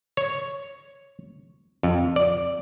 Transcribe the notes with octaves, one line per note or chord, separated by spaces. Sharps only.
C#5
F2
D5